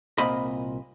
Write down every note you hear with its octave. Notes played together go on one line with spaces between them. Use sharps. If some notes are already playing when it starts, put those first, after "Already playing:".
C2 A#2 C4 D#5 B5